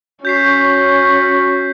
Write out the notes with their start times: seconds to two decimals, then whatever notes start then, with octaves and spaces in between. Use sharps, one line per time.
0.25 C#4 F#4 G6 B6 C7